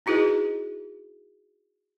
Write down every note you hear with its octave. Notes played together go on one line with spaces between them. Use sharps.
D#4 E4 F#4 G#4 B4 D#5